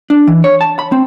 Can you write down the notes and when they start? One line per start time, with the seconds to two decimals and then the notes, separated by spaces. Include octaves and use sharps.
0.10 D4
0.27 E3
0.44 C#5
0.61 A5
0.79 B5
0.92 C4